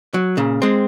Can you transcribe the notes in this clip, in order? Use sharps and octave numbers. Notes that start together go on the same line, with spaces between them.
F#3
A#2 C#3
G#3 C4